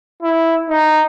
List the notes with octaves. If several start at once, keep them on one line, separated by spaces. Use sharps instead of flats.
E4
D#4